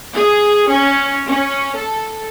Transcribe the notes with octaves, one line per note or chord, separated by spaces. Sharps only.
G#4
C#4
C#4
A4